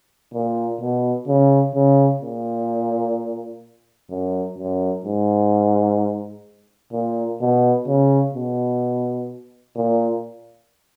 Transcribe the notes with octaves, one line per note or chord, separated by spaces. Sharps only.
A#2
B2
C#3
C#3
A#2
F#2
F#2
G#2
A#2
B2
C#3
B2
A#2